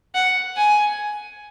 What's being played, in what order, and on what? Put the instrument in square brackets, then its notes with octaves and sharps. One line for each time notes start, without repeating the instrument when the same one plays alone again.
[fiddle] F#5
G#5